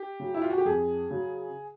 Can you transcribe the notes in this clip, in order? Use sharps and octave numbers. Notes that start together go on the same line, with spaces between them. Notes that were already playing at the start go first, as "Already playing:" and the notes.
Already playing: G4
C#3 F#3
E4
F4
F#4
G4
F2 G#4
C#3 F#3